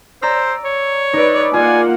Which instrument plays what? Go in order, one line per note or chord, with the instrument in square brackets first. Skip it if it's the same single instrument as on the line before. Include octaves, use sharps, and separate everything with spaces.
[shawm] C5 [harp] D5 A#5 E6
[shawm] C#5
[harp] D#4 E6 [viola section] B4 D5
[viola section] A#3 F#5 [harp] F4 [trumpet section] D5 G#5